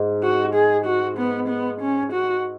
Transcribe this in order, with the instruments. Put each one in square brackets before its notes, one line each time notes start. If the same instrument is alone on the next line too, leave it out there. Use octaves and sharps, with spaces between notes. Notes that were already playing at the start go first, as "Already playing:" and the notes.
Already playing: [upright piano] G#2
[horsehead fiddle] F#4
G#4
F#4
B3
B3
C#4
F#4